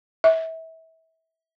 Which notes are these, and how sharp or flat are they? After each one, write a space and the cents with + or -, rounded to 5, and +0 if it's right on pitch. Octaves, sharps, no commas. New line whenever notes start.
E5 -30